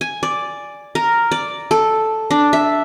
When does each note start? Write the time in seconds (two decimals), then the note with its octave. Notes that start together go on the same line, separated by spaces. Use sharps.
0.01 G#5
0.23 D5
0.95 A#4
1.32 D5
1.71 A4
2.31 D4
2.53 E5